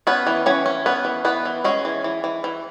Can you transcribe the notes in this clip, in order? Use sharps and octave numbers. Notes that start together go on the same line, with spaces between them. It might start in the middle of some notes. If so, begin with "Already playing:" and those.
B3 C#4 B4
E3
E3 C#4 C#5
C#4
B3 C#4 B4
E3
E3 B3 B4
E3
G#3 C#4 G#4
E3
E3
E3
E3